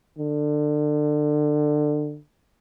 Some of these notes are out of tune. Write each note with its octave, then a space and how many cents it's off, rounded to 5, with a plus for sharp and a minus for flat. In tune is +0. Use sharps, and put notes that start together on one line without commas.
D3 +25